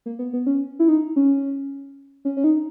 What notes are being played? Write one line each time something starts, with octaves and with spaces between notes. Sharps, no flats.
A#3
B3
B3
C#4
E4
D#4
C#4
C#4
C#4
D#4